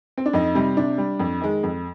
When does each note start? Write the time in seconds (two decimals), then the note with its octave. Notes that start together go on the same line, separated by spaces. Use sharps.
0.18 C4
0.26 D4
0.33 F2 D#4
0.55 C3 G3
0.77 C3 D4
0.98 G3
1.20 F2
1.41 D#3 G#3
1.63 F2